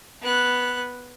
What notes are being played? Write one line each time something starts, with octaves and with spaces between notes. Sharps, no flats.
B3 F#6